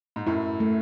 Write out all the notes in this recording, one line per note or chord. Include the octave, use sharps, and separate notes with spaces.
G#2
F#2 A2 E4
A3